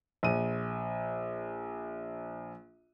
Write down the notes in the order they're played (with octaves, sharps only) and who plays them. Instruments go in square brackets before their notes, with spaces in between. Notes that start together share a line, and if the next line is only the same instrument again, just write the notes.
[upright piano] A#1 D#7